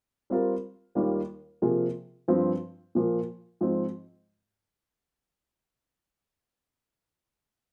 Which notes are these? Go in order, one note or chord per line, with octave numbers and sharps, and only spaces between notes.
G3 C4 F4 A#4
D#2 D#3 G3 A#3 F4
C3 F3 A#3 F4 G#4
G2 F3 C4
A#2 F3 A#3
G#2 F3 C4